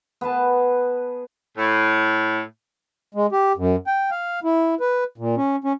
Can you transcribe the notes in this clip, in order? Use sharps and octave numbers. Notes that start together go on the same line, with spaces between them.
B3 G#4 B4 A5
A2
G#3
G4
F#2
G5
F5
E4
B4
A#2
C#4
C#4